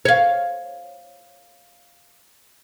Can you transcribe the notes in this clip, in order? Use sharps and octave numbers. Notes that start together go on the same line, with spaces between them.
C#5 F5